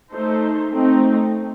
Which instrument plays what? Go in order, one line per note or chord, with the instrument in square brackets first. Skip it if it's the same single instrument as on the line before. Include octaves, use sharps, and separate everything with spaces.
[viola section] A3 D#4 A4 C5
A3 C4 D#4